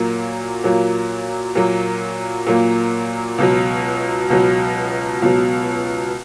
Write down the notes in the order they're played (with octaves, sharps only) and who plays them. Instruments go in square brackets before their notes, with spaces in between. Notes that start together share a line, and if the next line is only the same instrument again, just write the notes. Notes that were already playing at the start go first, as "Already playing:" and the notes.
Already playing: [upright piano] A#2 F#3 A#3
A#2 F#3 A#3
A#2 F#3 A#3
A#2 F#3 A#3
C#2 B2 F#3
C#2 B2 F#3
C#2 B2 F#3